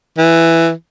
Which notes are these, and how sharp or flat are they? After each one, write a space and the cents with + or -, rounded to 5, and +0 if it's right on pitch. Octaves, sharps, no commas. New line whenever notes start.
E3 +5